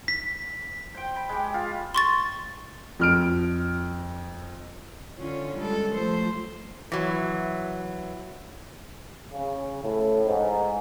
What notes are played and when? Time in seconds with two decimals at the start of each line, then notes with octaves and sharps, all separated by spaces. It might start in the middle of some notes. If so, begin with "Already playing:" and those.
0.08 B6
0.95 C5 G5
1.16 B5
1.29 G#3 G4
1.54 F4
1.94 C6 C#6 A6
2.99 F2 F6 D7
5.18 D3 C#4 F4
5.57 G3 G#3 A4
5.95 F3 A3 C5
6.92 E3 F#3
9.32 C#3
9.83 A2
10.24 G#2